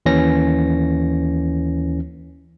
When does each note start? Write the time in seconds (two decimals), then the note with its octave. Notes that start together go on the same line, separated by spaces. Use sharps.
0.06 D#2 E3 C#4 A#6